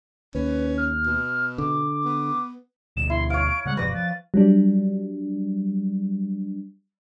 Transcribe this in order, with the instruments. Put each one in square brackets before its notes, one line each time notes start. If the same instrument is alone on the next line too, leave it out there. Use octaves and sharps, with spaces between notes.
[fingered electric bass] D#2 [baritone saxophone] C#4 [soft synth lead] B4
[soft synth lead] F6
[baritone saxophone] B2
[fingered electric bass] D3 [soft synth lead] D6
[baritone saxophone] B3
[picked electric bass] D2 B2 [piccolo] E7
[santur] E4 [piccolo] C6
[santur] C#5 F5 [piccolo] D7
[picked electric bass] C#3 G3 G#3 [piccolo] F#5
[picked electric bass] F#2 B2 F3 [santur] B4 D5 [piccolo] A#6
[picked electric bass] F3 [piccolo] A6
[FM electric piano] F#3 G3 D4